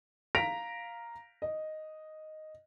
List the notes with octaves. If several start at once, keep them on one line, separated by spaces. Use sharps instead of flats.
F5 A#5 A#6 B6 D7 F7
D#5